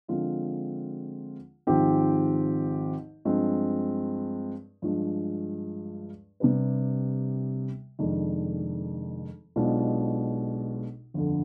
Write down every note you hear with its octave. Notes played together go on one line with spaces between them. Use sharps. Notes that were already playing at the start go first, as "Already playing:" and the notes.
D3 F3 G#3 C4 F4
G#1 G#2 F3 C4 G4
G2 F3 G#3 C4
G2 F3 G#3
C3 G3 D4 G4 B4
F1 F2 D#3 G#3 D4
B1 B2 G#3 D4 F4
G1 F2 D3